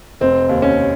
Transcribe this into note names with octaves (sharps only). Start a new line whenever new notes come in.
F1 C4
D#2
C#4